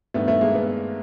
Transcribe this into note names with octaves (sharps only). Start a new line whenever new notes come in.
G2 D#3 A3 B3
A3 B3
G#3 A#3
A3 B3